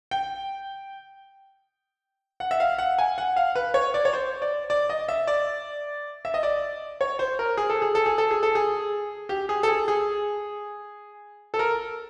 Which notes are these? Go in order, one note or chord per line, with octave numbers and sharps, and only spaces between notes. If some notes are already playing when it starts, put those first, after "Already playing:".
G5
F#5
E5
F5
F#5
G#5
F#5
F5
B4
C#5
D5
C#5
C5
D5
D5
D#5
E5
D5
E5
D#5
D5
C#5
C5
A#4
G#4
A4
G#4
A4
G#4
A4
G#4
A4
G#4
G4
G#4
A4
G#4
G#4
A4
A#4